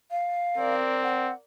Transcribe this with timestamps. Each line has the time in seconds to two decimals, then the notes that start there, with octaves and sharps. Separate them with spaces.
0.11 F5
0.58 C4 A#4 D5
1.03 F#5